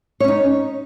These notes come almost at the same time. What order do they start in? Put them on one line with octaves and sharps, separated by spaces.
C#5 C#4 D#4